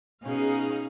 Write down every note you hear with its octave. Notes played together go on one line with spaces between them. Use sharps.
B2 C#4 D#4 G#4 F5